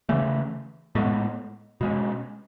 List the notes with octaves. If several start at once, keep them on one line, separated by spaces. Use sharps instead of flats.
C#3 E3 A3 C#4
A2 G#3 B3
B2 G#3 C#4